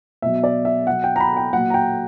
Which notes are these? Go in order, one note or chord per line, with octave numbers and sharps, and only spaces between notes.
B2 F#3 E5
D5
E5
B2 F#3 F#5
G5
A#5
B5
G5
A#2 F#3 F#5
A#5
G5